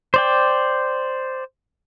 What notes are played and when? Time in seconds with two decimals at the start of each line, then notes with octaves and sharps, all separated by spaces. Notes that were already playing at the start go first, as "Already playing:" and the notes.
0.14 C5 D5 G5